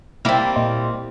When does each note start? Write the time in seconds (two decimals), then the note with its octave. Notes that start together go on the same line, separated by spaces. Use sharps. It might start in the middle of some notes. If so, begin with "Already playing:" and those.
0.25 G3 A#3 C4 E4
0.56 A#2 D#5 C6